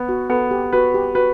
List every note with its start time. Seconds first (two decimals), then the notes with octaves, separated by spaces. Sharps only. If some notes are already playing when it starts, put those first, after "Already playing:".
Already playing: B3
0.09 F#4
0.30 B3 A4
0.51 G4
0.73 F#4 B4
0.94 G4
1.15 F#4 B4